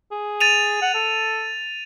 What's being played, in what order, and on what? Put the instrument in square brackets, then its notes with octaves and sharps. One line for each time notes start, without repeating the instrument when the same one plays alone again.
[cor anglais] G#4
[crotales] A6 D#7 F7
[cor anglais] F#5
A4